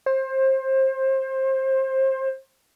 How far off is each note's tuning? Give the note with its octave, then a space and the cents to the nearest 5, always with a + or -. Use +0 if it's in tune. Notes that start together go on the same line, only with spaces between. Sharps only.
C5 +25